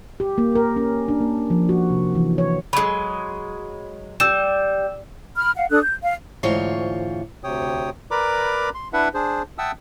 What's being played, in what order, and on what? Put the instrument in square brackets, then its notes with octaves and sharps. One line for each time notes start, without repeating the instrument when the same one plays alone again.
[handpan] G4
A#3
A#4
C#4
D4
A#3
F3
F#4
C3
E3
C#5
[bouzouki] F#3 G#3 [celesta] B5
[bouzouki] G3 [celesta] E6 E7
[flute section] B5 F6
F5 F#5
D4 A4 D#6 F#6
G6
F5
[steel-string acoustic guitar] D2 G#2 E3 F4 C5 C#5
[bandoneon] D2 C3 C#5 G5 D#6
A#4 B4 D5 A#5 B5 D6
C6
D4 E4 B4 E5 F#5
D4 G#4 C5
E5 F#5 G5 A5 D#6 E6